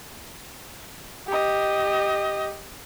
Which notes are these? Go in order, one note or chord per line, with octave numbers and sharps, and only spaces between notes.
G4 D#5